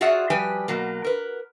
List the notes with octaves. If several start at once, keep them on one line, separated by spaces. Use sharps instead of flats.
F4 F#4 G#4 D5 E5 F#5
F3 G3 G4 B4 G5 G#5
B2 F#3 A#3
A#4 B4